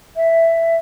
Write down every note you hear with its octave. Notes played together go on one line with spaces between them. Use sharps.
E5